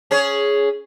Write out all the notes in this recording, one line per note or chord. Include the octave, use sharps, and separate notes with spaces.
C#4 G#4 C#5